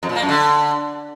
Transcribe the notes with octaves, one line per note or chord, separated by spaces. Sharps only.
F2
A#2
A#3
F#2
D3